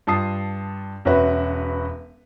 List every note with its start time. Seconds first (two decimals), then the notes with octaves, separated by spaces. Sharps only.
0.07 G2 F4 A5 D#6 C7
1.05 E1 C#4 F#4 B4 E5